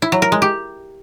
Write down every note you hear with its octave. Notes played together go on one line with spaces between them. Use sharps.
E4
F#3
A#4
G#3
G4